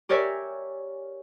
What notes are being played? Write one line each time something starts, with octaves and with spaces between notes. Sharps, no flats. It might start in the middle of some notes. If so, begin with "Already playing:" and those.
G4 A#4 C#5 D5 E5 G#5